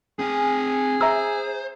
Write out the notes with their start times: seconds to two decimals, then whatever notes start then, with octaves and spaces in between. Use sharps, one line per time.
0.19 C4 G#4 G#5
1.01 C5 E5 A#5 E6